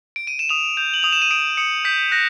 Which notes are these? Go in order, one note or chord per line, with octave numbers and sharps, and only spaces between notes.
D7
D#7
E7
D#6 F7
G6 F7
F#7
D#6 F7
E7
D#7
D#6 D7
D#6 C#7
G6 B6
F#6 A#6